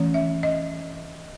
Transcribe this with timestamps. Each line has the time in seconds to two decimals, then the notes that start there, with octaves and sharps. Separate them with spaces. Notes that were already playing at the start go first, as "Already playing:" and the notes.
Already playing: E3 A3 C#4
0.14 E5
0.43 D#5